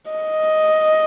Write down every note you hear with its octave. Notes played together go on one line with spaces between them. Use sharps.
D#5